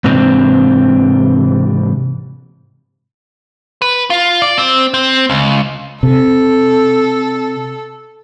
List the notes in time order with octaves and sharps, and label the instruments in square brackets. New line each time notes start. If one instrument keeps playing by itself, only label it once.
[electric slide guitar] G#2 C3 E3 C4 D4
[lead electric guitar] B4
F4
D5
C4
C4
C#2
[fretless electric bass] C3 [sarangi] A4